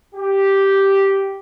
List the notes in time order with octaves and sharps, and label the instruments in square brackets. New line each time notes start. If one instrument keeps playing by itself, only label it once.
[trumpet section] G4